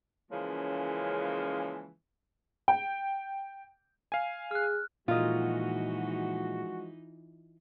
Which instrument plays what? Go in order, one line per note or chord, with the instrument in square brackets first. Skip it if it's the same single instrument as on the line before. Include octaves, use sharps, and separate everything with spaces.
[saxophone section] C#3 E3 F3 G#3 A#3 C#4
[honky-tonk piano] G5
[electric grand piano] F5 G#5
[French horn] G#4 [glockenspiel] F6 F#6
[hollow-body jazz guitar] A#2 [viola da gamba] E3 D#4 [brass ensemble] F3 G#3 F#4 [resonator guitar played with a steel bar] F4 D#5